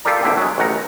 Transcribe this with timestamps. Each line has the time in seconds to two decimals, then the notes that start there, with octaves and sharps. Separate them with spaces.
0.05 F4 G4 A4 A#4 D5 A#5
0.23 G#1 E2 D3 E5 G5
0.37 F#3 G#3
0.58 A1 D#3 F#5 A#5